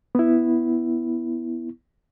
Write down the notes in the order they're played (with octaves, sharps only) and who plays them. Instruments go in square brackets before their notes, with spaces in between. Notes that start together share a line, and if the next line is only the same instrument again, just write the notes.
[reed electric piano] B3 E4